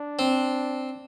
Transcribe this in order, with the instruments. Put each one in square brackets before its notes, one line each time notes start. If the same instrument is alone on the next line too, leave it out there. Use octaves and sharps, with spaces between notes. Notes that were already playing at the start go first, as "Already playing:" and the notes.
Already playing: [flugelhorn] D4
[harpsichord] C4